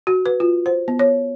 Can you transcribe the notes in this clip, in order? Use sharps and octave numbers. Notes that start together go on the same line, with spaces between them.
F#4
B4
F4
C5
B3
C#5